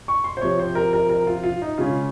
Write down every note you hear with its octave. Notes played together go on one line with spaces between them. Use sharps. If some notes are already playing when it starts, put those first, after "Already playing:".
C#6
C6
C5
C3 F3 C4 C#5
C5
A#4
A#4
A#4
F4
F4
D#4
C#3 G#3 C#4 F4